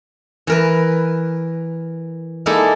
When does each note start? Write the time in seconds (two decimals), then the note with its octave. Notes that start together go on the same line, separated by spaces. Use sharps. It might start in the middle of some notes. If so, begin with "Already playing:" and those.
0.47 E3 A#4 B4
2.46 G#3 A#3 D#4 E4 A4 D5